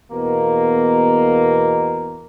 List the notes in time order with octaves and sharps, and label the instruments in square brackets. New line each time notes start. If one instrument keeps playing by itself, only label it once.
[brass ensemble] E2 B2 A#3